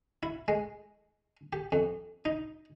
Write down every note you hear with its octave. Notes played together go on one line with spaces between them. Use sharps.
E4
G#3
G4
F2
D#4